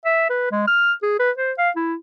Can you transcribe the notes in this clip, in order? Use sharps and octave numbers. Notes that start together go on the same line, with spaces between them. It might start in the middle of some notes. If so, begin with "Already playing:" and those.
E5
B4
G#3
F6
G#4
B4
C5
F5
E4